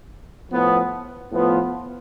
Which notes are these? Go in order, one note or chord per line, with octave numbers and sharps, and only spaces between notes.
A2 F3 B3
A2 F3 B3 F4